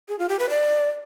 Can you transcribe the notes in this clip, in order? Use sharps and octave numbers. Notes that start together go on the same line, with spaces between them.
G#4
F4
G4
B4
D5